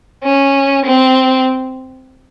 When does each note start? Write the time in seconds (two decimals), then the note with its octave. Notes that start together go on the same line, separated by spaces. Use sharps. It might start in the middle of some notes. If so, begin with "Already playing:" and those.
0.23 C#4
0.85 C4